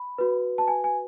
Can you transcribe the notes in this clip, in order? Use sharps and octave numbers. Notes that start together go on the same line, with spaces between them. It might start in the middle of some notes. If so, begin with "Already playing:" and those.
Already playing: B5
F#4 B4
A5
G#5
G#5